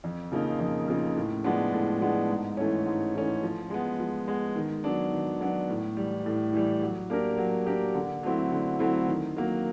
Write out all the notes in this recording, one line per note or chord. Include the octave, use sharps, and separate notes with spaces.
F2
C#3 F3 A#3 D#4
F2
C#3 F3 A#3 D#4
A2
F3 G#3 B3 D4
A2
F3 G#3 B3 D4
G#2
E3 A3 C#4
G#2
E3 A3 C#4
F3
G#3 B3
F3
G#3 B3
D#3
F#3 B3 D4
D#3
F#3 B3 D4
A2
E3 G3
A2
E3 G3
F#3
A#3 D4 G4 A#4
F#3
A#3 D4 G4 A#4
D3
F#3 A3 C4 E4
D3
F#3 A3 C4 E4
D#3
F#3 A#3